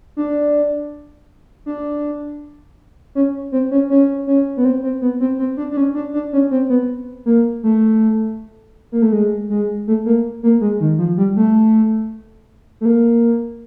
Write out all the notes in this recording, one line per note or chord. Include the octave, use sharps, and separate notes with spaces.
D4
D4
C#4
C4
C#4
C#4
C#4
B3
C4
C4
B3
C4
C4
D4
D4
C#4
D4
D4
C#4
C4
B3
A#3
A3
A#3
A3
G#3
G#3
A3
A#3
A#3
G#3
D#3
F3
G3
A3
A3
A#3